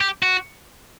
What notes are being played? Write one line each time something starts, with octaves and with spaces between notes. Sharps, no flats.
G4
F#4